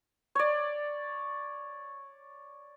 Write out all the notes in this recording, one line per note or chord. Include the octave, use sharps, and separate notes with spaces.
C#5 D5